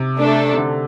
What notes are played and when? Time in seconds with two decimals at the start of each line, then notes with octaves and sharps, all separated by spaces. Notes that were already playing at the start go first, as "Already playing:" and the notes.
Already playing: C3
0.17 A3 D4 A4
0.53 C3
0.58 D3